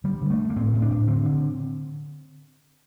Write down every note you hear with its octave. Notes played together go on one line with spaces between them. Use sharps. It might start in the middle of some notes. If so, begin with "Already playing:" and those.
D3 G3
D3
A3
G2
A#3
A2 C4
A2
D4
A2
D3 C4
D3